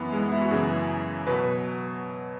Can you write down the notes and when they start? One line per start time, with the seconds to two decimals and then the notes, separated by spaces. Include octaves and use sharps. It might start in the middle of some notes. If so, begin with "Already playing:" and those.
Already playing: F#2 E3 B3
0.13 G#3
0.22 B3
0.32 E4
0.41 F#4
0.51 F#2 C#3 E3 G#4
1.27 B2 F#3 B4